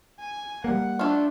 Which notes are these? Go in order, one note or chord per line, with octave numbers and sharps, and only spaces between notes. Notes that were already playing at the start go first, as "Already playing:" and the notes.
G#5
G3 A#3 F#5
A3 D4 F4